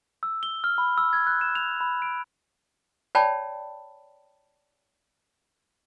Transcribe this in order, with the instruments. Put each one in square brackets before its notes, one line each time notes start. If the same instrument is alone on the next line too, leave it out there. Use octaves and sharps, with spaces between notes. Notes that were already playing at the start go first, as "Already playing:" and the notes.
[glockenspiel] E6
G7
F6
B5
E6
G#6
F#6
E7
F7
B5
D7
[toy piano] C#5 D5 G5 A5 B5